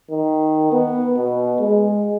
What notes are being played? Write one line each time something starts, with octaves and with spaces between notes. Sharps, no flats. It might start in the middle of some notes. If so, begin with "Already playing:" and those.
D#3
B3
B2
G#3